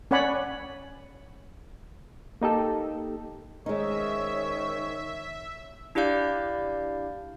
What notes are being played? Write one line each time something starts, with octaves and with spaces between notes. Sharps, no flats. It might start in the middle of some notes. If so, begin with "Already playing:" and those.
C#4 C#5 D5 F#5 G#5 B5
A#3 D#4 G4 A4
D#3 G#3 C#4 D#4 C5 C#5 E5
D4 E4 G4 D5 F5 G6